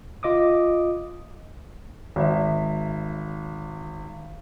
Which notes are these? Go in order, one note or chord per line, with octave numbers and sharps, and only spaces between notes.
F4 D#5 D6 D#6
G#1 E5